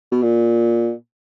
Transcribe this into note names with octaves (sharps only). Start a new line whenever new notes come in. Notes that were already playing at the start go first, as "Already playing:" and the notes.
B2
A#2